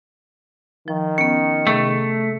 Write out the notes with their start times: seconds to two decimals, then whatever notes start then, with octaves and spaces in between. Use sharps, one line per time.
0.88 D#3 F3
1.18 B3 C#4 C#7
1.67 C3 A3 G#4 A4